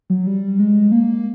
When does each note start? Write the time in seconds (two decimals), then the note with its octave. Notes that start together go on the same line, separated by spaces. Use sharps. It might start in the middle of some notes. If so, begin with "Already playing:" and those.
0.10 F#3
0.27 G3
0.59 G#3
0.92 A#3